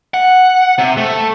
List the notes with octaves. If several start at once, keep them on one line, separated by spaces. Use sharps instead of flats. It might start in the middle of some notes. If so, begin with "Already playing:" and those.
F#5
C3
A3